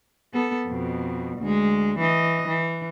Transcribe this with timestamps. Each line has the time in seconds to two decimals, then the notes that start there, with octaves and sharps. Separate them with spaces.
0.33 B3 A4
0.68 F2 B2
1.39 D2 G#3
1.99 E3 D#5
2.48 E3